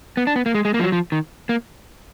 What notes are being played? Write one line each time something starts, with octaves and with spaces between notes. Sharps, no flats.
B3
D4
B3
A#3
G#3
G#3
A#3
F3
F#3
F3
D#3
A#3